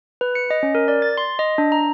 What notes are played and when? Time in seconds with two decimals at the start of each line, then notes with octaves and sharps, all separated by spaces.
0.21 B4
0.35 C#7
0.50 D#5
0.63 C#4
0.75 A#4
0.88 D5
1.02 A6
1.18 C6
1.39 D#5
1.58 D4
1.72 A#5